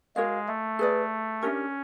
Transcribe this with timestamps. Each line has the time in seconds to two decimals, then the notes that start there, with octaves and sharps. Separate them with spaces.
0.16 G#3 F#4 A#4 C#5 F5
0.48 A3
0.79 G#4 B4 D5
1.42 C#4 D4 G4 A#4